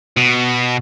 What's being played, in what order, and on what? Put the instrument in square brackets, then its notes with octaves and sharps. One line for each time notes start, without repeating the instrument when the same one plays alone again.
[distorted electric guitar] B2